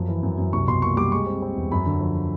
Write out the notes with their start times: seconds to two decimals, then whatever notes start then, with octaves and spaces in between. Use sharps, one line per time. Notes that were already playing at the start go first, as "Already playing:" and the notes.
Already playing: F#2 F3
0.08 E3
0.23 F#2
0.38 F#2
0.53 C2 C#6
0.68 B2 C6
0.82 A#3 C#6
0.97 G3 D6
1.12 G#3 C#6
1.27 C4
1.42 C4
1.56 E2
1.71 F#2 B5
1.86 D3
2.01 F3